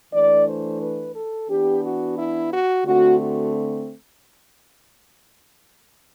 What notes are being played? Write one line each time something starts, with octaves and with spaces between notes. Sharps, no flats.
E3 A3 D4 D5
C5
B4
A4
E3 B3 D4 G4
F#4
E4
F#4
D3 A3 C4 F#4
F#4